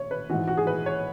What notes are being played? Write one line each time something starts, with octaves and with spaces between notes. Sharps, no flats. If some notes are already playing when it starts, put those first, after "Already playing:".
Already playing: C#5
B4
G#2 E3 F#4
F#4
G#4
B4
C#5